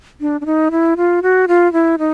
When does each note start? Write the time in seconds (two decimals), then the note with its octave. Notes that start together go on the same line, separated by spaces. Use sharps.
0.21 D4
0.41 D4
0.46 D#4
0.71 E4
0.97 F4
1.23 F#4
1.48 F4
1.73 E4
1.99 D#4